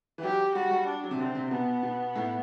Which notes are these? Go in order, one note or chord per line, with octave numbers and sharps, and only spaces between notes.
E3
F#3 G4
G3 F#4
G3
D4
F#3
C3
D3 C4
C3
B2 B3
B2
A2